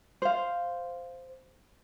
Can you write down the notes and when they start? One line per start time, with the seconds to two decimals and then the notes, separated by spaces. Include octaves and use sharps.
0.22 C5 F5